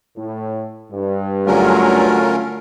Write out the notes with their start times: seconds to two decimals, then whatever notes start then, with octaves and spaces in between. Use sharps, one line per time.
0.15 A2
0.91 G2
1.47 D3 F#3 A3 C#4 F4 A#4